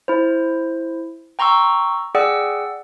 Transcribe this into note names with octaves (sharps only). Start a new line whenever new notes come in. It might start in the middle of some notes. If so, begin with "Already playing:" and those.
E4 C5
G5 A#5 C6 C#6 E6
G#4 D5 F#5 G5 E6